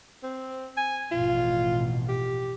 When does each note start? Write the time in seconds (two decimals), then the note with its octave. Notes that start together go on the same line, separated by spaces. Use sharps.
0.23 C4
0.77 G#5
1.11 A1 F2 B2 F4
2.09 G4